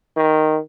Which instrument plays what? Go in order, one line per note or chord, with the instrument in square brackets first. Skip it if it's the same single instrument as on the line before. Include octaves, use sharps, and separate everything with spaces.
[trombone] D#3